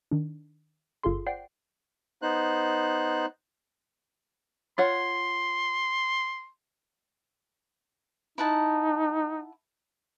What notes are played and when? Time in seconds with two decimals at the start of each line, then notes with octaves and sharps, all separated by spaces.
0.11 D#3 D4
1.03 G1 F4 G#4 A4 C6
1.27 C5 D5 F#5 G5 C7
2.22 B3 D#4 C5 F#6
4.78 F4 C#5 F#5 C6
8.38 D#4 E4 F#5 A5